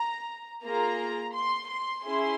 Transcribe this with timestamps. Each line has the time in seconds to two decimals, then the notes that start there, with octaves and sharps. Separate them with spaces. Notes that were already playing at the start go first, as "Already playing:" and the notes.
Already playing: A#5
0.64 A#3 F4 G#4 A#5
1.33 C6
1.69 C6
2.04 C#4 E4 G#4 C6